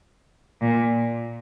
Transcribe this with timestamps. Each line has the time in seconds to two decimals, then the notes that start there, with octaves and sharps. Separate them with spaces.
0.62 A#2